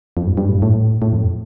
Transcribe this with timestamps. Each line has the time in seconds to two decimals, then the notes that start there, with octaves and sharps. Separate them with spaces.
0.17 F2
0.27 G2
0.37 G2
0.49 A2
0.56 G2
0.62 A2
1.02 A2
1.12 F2